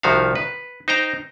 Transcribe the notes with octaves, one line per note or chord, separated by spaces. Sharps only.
C2 D#3 F3 F#4 E5 F5
B4
D#4 C5 G5 A#5